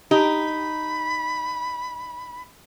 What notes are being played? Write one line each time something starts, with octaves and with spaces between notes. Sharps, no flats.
D#4 G4 B5